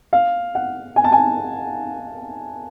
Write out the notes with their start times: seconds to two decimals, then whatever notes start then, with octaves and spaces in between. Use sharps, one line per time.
0.13 F5
0.55 F#5
0.96 G#5
1.04 A5
1.12 G#5